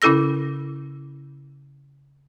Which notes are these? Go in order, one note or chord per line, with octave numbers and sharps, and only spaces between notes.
C#3 C#4 E4 A4 E6 A#6